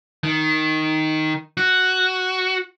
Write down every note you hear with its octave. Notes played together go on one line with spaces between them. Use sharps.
D#3
F#4